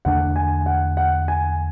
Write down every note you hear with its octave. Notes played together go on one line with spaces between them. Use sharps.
E2 D3 A3 D4 F#5
G#5
F#5
F#5
G#5